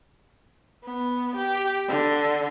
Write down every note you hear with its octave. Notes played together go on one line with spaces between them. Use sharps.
B3
G4
D3